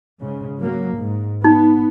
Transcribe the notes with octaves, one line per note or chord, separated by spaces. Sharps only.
G#2 C#3
F#3 A#3
G#2
B3 D#4